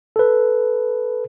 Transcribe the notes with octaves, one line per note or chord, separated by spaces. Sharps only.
A4 B4